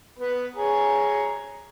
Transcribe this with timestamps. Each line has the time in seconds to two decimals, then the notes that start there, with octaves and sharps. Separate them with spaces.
0.19 B3 B4
0.56 G#4 C#5 A#5